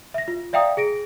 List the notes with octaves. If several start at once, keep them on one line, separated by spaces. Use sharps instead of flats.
E5 A#6
F4
D5 E5 F5 G5 A#5 D#6
G#4 A#6 D7